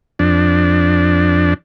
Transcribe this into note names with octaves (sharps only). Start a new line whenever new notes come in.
F2 D4